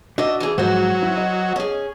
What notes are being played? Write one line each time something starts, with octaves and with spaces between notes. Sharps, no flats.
D4 F#4 D#5 E5
E3 G#4
G#2 F3 F#3 F#4 C5
E4
D#5
C#4 G#4